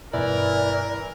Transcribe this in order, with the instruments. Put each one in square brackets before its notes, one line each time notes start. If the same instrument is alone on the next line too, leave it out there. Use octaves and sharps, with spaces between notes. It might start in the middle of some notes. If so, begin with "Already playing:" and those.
[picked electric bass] G2 B2 [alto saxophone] E3 [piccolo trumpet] A#4 [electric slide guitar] D5